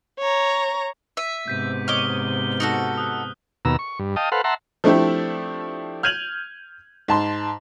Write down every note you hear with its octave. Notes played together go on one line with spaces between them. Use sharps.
C#5 A#5
E5 B6 D#7
G#2 C3 B3 G6 B6 D#7
C#5 D#5 D6 F6 G7
D#4 F#4 A4
D#6 F#6
D#2 B2 A#5 E6
C#6
G2
D#5 F5 G5 A5 D#6
A4 B4 C5 F5 F#5
E5 F#5 A5 A#5 C6
F3 A3 C4 D4 E4 G4
F6 G6 G#6 D#7 F7 F#7
G#2 A5 C6